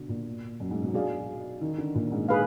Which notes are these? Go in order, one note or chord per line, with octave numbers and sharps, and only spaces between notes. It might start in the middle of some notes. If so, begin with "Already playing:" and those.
Already playing: B2 D3
A#2
F#2
G#2
B2
F#3 D4 G#4 D5 F5
D#3
D3
A#2
G#2
G#4 B4 F5